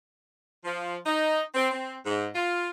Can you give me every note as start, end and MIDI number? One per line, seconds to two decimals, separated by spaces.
0.65 0.97 53
1.06 1.41 63
1.55 1.71 60
1.71 1.95 60
2.06 2.26 44
2.35 2.70 65